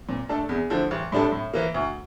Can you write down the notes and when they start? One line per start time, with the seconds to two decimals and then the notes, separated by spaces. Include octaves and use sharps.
0.09 A#2
0.29 A3 D4 A4
0.49 E2
0.70 D3 F3 A3 E4
0.91 A1
1.12 A2 G3 D4 A4
1.32 A2
1.54 E3 A#3
1.74 D2